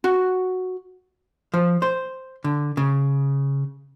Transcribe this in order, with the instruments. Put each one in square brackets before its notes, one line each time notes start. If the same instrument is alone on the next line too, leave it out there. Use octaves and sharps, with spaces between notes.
[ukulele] F#4
[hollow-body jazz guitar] F3
C5
D3
C#3